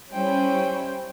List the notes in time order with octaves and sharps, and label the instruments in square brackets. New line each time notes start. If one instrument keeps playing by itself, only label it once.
[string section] G3 C#4 E4 [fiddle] C5 G5